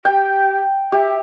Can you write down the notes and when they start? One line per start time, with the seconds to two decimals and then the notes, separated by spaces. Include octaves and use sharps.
0.05 G4 G5
0.92 G4 E5